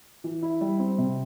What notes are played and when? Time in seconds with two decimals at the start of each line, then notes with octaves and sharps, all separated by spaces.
0.24 E3
0.43 E4
0.61 G3
0.80 C4
0.98 C3